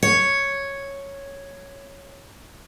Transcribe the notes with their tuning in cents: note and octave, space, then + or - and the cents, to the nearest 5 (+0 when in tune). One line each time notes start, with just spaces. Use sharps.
C#5 +0